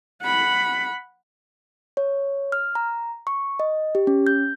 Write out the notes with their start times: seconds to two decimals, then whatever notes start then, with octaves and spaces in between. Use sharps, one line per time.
0.23 F#5 B5
1.97 C#5
2.52 F6
2.75 A#5
3.27 C#6
3.60 D#5
3.95 G4
4.07 C#4
4.27 G6